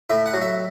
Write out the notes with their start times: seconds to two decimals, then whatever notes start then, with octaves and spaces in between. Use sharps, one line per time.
0.10 A2 E5
0.26 F#5
0.33 F#3
0.41 E5